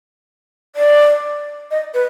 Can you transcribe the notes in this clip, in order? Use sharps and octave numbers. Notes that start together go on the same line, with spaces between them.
D5
D#5
B4